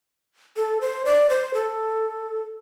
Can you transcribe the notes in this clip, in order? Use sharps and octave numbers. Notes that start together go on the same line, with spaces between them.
A4
C5
D5
C5
A4